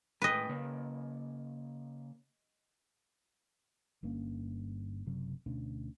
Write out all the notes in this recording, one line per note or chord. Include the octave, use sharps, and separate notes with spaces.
A2 G#3 B4 D#5 G5
C#3 A#3
G1 G2 A#3 C#4
F#1 F#2 C3 F#3
D2 B2 C#4 D4